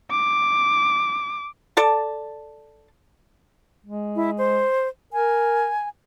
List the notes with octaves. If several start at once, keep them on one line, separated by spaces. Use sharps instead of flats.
D6
A4 D5 A5
G#3
E4
C5
A#4 G#5